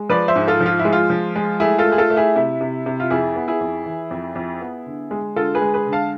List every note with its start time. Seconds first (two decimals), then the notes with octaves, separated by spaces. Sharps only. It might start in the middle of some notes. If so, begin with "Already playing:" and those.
Already playing: G#3
0.09 F3 B4 D5
0.28 C5 E5
0.36 G#2
0.48 F4 A4
0.61 F3
0.66 F4
0.79 E4
0.85 G#3
0.93 F4
1.10 F3
1.36 G#3
1.60 A3 E4 G#4
1.78 F4 A4
1.86 A3
1.92 G#4
1.98 F4 A4
2.10 A3
2.17 E4 G#4
2.35 C3 E4
2.61 C3
2.86 C3
3.00 F4
3.10 F2 E4 G#4
3.35 B3
3.48 E4 G#4
3.61 F2
3.86 E3
4.11 F2
4.35 F2
4.61 B3
4.86 D3
5.11 G#3
5.36 D3 F4 A4
5.55 G#4 B4
5.62 G#3
5.74 G#4 B4
5.87 D3
5.93 F5 A5